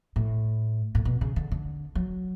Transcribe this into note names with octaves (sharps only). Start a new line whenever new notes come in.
A2
A2
B2
C#3
D3
D3
F#3